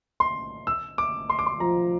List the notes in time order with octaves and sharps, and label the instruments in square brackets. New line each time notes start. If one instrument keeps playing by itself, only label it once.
[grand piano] C6
E6
D6
C6
D6
C6
[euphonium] F3 [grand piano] A#5